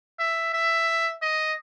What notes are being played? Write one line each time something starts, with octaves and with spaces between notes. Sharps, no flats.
E5
E5
D#5